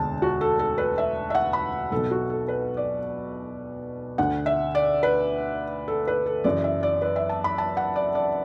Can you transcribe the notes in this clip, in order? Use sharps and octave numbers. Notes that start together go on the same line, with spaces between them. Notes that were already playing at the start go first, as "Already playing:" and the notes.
Already playing: E1 D2 D3 A5
F#4
A4
A4
B4
E5
E5
F#5
B5
B1 B2 A4
F#4
A4
B4
D5
D2 D3 F#5
E5
D5
B4
A4
B4
A4
F#1 F#2 E3 D5
E5
D5
B4
E5
A5
B5
A5
F#5
D5
D5